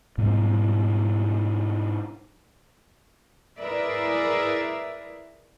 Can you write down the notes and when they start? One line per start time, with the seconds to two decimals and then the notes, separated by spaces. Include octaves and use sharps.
0.18 G#2 B2 G3
3.59 E4 G#4 A#4 B4 D5 E5